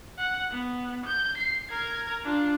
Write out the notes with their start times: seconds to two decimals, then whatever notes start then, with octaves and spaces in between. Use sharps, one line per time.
0.18 F#5
0.51 B3
1.06 G6
1.38 C7
1.71 A#4 G#6
2.24 D4 F4